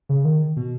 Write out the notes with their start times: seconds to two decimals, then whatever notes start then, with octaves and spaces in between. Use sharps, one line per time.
0.09 C#3
0.25 D#3
0.56 B2